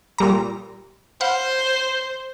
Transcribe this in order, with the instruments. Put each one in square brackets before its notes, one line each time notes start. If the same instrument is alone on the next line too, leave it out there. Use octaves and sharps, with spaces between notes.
[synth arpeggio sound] A#2 G3 A#5
[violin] C5 [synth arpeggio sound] F5 F#5 B5